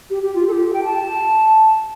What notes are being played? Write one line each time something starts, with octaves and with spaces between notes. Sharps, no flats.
G4
G4
F4
A4
G4
G5
A5